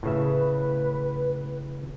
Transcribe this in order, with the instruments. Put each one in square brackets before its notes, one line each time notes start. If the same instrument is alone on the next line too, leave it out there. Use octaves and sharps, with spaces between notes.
[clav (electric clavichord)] A2 C#3 E5 [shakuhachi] B4